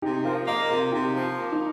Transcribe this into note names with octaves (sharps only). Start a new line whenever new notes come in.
C3 D#4 G4
F3 F4 A#4
A#3 A#4 D#5
C3 F4 A#4
C3 D#4 G4
F3
F4
A#3
D#4